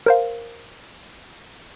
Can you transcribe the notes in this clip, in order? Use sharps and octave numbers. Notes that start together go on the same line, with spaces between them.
A#4 C5 F5